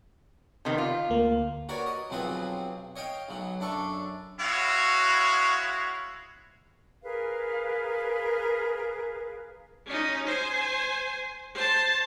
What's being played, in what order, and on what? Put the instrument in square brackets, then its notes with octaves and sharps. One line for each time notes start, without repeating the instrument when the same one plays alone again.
[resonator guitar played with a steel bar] C3 D#3 B3
F4
[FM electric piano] D2 A#3
[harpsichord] F#4 A#4 B4 C#5 D5
D#5
B1 F2 F#3 C4 G#4 B4
C#5 D#5 F5 G5
B1 F#3
F#2 D4 A4 C#6
[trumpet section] G#3 E4 F#4 C#5 F5
[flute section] G#4 A#4 B4 F5
[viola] C#4 D#4
C5 G#5
C5 A5